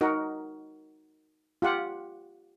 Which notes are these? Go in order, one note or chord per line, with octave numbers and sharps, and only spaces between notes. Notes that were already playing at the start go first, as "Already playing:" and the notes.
D#4 F#4 A#4
F4 G4 F#5